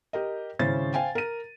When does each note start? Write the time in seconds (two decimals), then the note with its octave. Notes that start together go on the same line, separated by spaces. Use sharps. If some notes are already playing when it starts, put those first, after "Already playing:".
0.13 G4 A#4 D#5
0.59 G#1 C#3 C#4 E4 C5 A6
0.94 C5 F5 G5 G#5
1.15 A#4 D#7